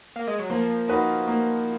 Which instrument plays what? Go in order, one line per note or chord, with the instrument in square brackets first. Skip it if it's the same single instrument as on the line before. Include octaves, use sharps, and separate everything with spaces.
[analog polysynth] A#3
G#3
F#3
[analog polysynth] F3 [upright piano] A#3
[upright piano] D#4 F#4 B4
A#3